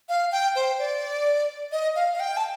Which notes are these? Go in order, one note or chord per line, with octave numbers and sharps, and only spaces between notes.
F5
G5
C5
D5
D#5
F5
F5
G5
A5